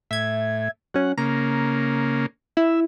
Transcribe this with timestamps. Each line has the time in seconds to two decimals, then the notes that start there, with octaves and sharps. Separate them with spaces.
0.11 A2 E5 G#6
0.94 F#3 C#4 F#5
1.18 C#3 A#3 A#5
2.57 E4 E5